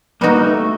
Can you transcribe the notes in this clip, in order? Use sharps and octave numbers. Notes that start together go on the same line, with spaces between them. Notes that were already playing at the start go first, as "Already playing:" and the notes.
G3 A#3 B3 D#4 F#4
A3